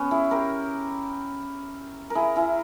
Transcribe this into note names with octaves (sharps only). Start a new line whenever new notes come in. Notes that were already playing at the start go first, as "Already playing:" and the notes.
Already playing: B3 C#4
E4 G#4
G4 A#4
A#4
E4 G#4
E4 G#4